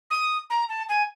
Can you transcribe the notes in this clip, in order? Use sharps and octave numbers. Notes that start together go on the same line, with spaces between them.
D#6
A#5
A5
G#5